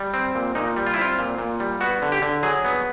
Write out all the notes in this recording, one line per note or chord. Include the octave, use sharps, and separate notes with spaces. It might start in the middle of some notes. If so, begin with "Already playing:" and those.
Already playing: G3
C4
A#2
A#2 D#4
G3
F4
E4
C4 F4
A#2
A#2
G3
B3 F#4
D3
G4
D3
F#3 G#4
B3